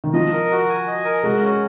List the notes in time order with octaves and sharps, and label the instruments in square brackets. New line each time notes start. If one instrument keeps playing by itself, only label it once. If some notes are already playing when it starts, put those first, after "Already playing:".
[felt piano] D#3
[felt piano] F3 [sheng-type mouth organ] D#5
[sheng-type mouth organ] A#4
F#4
G#5
D#5
A#4
[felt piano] G#3 [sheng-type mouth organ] F#4
[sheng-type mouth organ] C#4